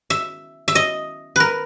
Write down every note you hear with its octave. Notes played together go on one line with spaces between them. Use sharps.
E5
E5
D#5
A#4 B4